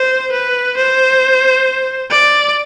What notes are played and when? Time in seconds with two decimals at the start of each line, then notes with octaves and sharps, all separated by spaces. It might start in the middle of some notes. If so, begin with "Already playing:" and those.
Already playing: C5
0.32 B4
0.77 C5
2.11 D5